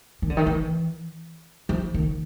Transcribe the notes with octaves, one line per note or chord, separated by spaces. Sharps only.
D#3
D3
D#3
E3
F3
D#3